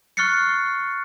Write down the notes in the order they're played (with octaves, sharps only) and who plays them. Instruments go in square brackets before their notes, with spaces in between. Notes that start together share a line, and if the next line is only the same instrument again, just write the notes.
[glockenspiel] C#6 F6 F#6 A6 C7 C#7